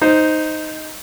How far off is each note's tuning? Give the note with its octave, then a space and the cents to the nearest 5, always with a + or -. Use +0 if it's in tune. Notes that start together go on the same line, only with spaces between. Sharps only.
D#4 +0 C5 +0